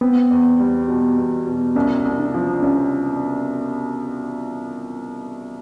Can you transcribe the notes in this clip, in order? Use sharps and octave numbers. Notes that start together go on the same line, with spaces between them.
B3 C4
E2
G3
B2
E2
B2
C2 C#4
C2
D4
F3
C2 C#4